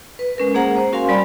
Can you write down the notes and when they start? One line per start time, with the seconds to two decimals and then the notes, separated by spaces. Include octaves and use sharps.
0.19 B4
0.38 G#3 C#4 A#4
0.55 A#3 C#4 G#4 C5 F#5 A#5
0.77 C5
0.92 C#4 F#4 A#4 F5 G#5 C6
1.09 G3 D5 B5